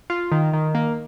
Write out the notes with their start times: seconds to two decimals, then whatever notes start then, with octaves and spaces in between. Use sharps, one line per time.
0.10 F4
0.32 D#3
0.53 D#3
0.75 A#3